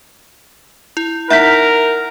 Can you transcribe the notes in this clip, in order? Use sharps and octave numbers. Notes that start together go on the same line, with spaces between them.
E4
D#4 A#4 E5 F#5 G6 B6